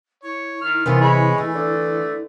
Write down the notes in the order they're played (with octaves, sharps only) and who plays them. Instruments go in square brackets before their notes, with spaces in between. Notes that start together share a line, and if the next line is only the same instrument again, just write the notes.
[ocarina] E4 [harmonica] C#5
[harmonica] D#3 F6
[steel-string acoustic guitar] C3 E3 [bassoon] D#3 [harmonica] B3 F4
[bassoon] G#3 [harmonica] C#5 B5
[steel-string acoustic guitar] E3 [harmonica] A3
[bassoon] D3